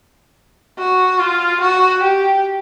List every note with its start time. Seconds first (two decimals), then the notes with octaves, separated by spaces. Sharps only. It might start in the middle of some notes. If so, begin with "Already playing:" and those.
0.79 F#4
1.20 F4
1.61 F#4
2.03 G4